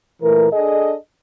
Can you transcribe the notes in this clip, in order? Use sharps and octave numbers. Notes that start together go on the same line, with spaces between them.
A#2 E3 A3 A#4
D4 G#4 A4 D#5